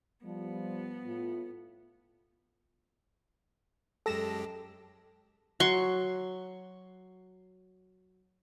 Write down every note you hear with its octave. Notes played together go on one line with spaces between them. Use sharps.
F3 G3 B3
A2 F4
F#2 G#3 G4 A4 A#6 E7
F#3 C6 C#6